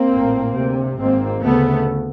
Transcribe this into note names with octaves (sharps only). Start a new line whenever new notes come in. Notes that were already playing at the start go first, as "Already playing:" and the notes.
Already playing: A#3 C4
A#1 A2
D2 C3
G#1 G#2 A#3 C4
D2 C#3 A3 B3